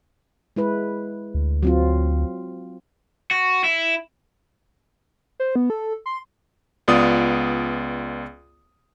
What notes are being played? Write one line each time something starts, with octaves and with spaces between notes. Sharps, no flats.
G#3 E4 B4
D2
F#3 C4 F4
F#4
E4
C5
B3
A4
C6
C#2 B3 F4 D5 D#6